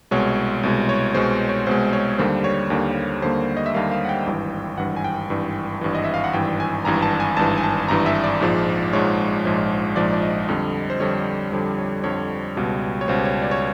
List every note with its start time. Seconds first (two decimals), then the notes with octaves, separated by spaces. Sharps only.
0.11 C2 B2 G#3 C#5
0.63 C2 B2 G#3
0.89 C#5
1.14 C2 B2 G#3 C5
1.49 C#5
1.66 C2 B2 G#3 C5
1.93 C#5
2.18 D#2 D3 G3 A#3 C5
2.44 C#5
2.70 D#2 D3 G3 A#3
3.22 D#2 D3 G3 A#3 C5
3.57 D#5
3.66 E5
3.74 D#2 D3 G3 A#3 F5
3.91 F5
4.05 F#5
4.09 G5
4.27 G#1 G2 E3
4.78 G#1 G2 E3 F#5
4.96 G#5
5.04 G5
5.30 G#1 G2 E3
5.81 G#1 G2 E3
5.95 D#5
6.04 E5
6.14 F5
6.24 F#5
6.33 G#1 G2 E3 G5
6.60 G#5
6.85 G#1 G2 E3 A#5
7.02 A5
7.20 G#5
7.37 G#1 G2 E3 A5
7.58 G#5
7.63 A5
7.88 G#1 G2 E3 A#5
8.06 E5
8.24 D5
8.41 A#1 G#2 F3 G#3
8.93 A#1 G#2 F3 G#3 C#5
9.45 A#1 G#2 F3 G#3
9.96 A#1 G#2 F3 G#3 D5
10.13 D5
10.22 D#5
10.49 F2 D3 G3
10.90 C5
11.00 F2 D3 G3 C#5
11.52 F2 D3 G3 C5
11.78 C#5
12.04 F2 D3 G3 C#5
12.56 C#2 B2 G3
13.01 C#5
13.08 C#2 B2 G3 C5
13.25 C#5
13.42 D5
13.51 C#5